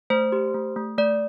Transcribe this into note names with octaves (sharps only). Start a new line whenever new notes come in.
A3 C5
G4
A3
A3
A3 D5